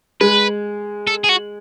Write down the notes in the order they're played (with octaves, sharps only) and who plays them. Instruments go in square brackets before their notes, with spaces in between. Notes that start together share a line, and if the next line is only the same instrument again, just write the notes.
[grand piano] G#3 [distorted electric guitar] B4
[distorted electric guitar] A4
G#4
F#4